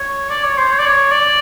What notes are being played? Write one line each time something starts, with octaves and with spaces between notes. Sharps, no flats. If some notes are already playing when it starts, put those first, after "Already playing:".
Already playing: C#5
D5
C#5
C5
C#5
D5
C#5
D5